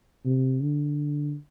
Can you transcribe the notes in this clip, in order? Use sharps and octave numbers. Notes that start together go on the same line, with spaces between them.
C3
D3